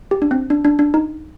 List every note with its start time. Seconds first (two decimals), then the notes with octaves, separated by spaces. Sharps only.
0.11 G4
0.22 D4
0.31 C4
0.50 D4
0.65 D4
0.79 D4
0.94 D#4